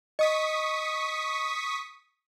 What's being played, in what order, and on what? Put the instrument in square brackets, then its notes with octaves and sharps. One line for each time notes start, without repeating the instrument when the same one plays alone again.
[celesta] D#5 [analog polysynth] C#6 D#6 B6